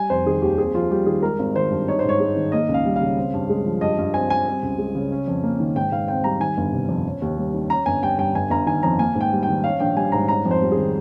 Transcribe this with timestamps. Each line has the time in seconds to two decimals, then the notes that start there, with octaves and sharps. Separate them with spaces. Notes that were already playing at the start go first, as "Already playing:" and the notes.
Already playing: G3 G#5
0.10 F1 C5
0.26 D#3 G#4
0.42 D#2 G4
0.58 C4 G#4
0.74 F2 F4
0.91 G3 G4
1.06 D#3 G#4
1.23 G#3 A#4
1.39 G#1
1.56 D#3 C5
1.71 G2
1.88 D#4 C#5
1.99 C5
2.04 G#2 C#5
2.20 G#3
2.36 D#3
2.52 A#3 D#5
2.69 C#2
2.74 F5
2.85 G3
2.96 F5
3.02 C#3
3.17 C4
3.34 G2
3.49 G#3
3.66 F3
3.81 G2 D#5
3.98 G2
4.14 C4 G#5
4.30 G3 G#5
4.47 C4
4.63 C#2
4.78 G#3
4.95 C#3
5.12 C#4
5.27 F2
5.44 A#3
5.60 D#3
5.76 G#2 G5
5.92 G#2 F5
6.08 C4 G5
6.24 G3 A#5
6.40 D#3 G#5
6.57 G1
6.72 C3
6.89 F2
7.06 C#4
7.22 D#2
7.38 G3
7.54 D#3
7.69 C#4 A#5
7.86 G1 G#5
8.03 G3 G5
8.19 G2 G5
8.34 G1 G#5
8.50 G1 A#5
8.66 D#3 G#5
8.83 F2 A#5
8.99 A#3 G#5
9.15 G#2
9.21 G5
9.32 G3
9.43 G5
9.48 D#3
9.64 C#4 F5
9.80 A#1 G5
9.97 G3 G#5
10.12 G#2 A#5
10.28 C#4 A#5
10.45 F2
10.51 C5
10.61 G3
10.72 D#3 G#4